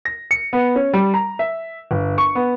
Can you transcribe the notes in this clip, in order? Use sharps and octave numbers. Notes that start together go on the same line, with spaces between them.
A#6
C#7
B3
C#4
G3
A#5
E5
G1
C#6
B3